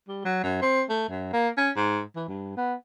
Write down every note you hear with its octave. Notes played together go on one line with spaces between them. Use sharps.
G3
F#3
F#2
C4
A3
F#2
A#3
C#4
G#2
E3
G2
B3